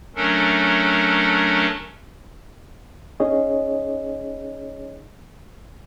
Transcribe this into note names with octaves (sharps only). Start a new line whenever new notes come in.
F#3 A3 C#4 D4 A4 A#4
C#4 D#4 G#4 C#5 D#5